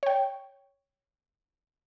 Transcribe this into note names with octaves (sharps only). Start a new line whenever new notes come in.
C#5 G5